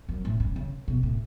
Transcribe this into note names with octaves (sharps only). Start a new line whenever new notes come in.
F#2
A2
C#3
C#3
B2
A2